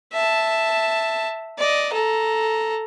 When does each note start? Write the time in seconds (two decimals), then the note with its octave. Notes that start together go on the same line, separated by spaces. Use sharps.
0.13 E5 A5
1.58 D5 D#5
1.93 A4 A#5